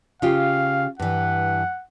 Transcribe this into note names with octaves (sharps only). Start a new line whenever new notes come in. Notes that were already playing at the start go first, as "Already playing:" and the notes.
C#3 F4 G4 F5
G2 E3 F#5